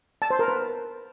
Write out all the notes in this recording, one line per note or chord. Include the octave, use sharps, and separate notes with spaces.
A5
C5
A#4
B4